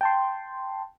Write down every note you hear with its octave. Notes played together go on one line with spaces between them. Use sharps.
G5 A5 C6